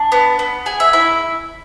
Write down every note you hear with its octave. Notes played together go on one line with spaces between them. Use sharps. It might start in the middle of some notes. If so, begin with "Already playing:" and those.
Already playing: D4 A5
B3
B3
G#4 G#5
E5
E4 E5